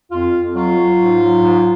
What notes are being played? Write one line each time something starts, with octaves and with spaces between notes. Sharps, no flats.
F2 F4
F2
F#3 F4
F#3
G#2
F#3
G#2